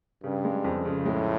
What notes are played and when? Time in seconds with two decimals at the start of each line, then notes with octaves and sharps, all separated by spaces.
0.23 G2 C#3
0.44 G#3
0.64 F2
0.85 C#3
1.05 A2 G#3